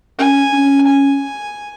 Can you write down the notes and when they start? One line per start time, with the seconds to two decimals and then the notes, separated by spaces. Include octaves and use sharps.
0.18 C#4 G#5
0.53 C#4
0.87 G#5